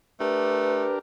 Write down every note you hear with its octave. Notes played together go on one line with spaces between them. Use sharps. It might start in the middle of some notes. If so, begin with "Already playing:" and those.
A3 D4 G4 A#4 B4